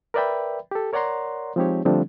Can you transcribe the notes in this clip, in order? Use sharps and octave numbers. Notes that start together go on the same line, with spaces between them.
A#4 B4 D5 E5 G5 B5
G4 A4
A#4 C#5 D5 F#5 A#5 C6
F3 G#3 C4 D#4 G4 C#5
D3 F3 G3 A3 C4 D4